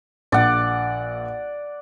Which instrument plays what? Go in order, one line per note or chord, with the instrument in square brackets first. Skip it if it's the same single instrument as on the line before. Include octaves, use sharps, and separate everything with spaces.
[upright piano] A#1 [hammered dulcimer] D5 F#5